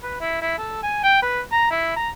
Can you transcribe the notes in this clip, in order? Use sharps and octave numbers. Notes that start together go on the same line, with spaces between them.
B4
E4
E4
A4
G#5
G5
B4
A#5
E4
A#5